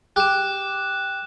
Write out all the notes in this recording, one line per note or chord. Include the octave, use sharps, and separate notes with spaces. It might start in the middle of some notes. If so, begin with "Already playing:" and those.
G4 F#6 E7